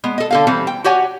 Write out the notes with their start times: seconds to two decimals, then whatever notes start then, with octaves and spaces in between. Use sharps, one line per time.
0.04 G#3 B3
0.18 A4 D#5
0.31 D3 A4 F5
0.47 E3 G3 C4
0.67 G5
0.84 F#4 G4 C#5 F#5 G#5